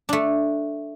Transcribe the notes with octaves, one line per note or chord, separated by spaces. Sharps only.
A3 D4